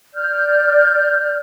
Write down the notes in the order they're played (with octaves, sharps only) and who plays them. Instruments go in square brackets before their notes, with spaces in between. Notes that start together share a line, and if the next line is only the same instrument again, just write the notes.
[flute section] D5 F6 G6